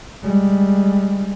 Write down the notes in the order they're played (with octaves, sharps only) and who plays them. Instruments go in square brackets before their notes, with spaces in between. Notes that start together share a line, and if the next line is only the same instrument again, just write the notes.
[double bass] G3 G#3